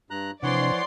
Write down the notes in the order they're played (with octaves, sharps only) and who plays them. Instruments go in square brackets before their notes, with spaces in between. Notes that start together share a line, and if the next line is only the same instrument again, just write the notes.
[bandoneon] G2 A#5 F#6
[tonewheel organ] C3 D4 [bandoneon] E3 C#5 F#5 [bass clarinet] F3 [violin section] D5 C6